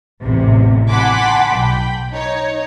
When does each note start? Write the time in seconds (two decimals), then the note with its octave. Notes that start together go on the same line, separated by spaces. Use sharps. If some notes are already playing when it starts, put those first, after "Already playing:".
0.22 A1 E2 C3
0.90 F#5 G#5 A5 B5 C6 D6
1.56 B1 G5 B5
2.13 D#4 C#5